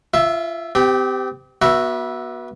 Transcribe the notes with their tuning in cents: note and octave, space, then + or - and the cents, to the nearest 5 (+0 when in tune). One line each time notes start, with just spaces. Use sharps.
F4 -25 E5 +0
C4 -35 G4 +0
B3 -30 F#4 +0 E5 +0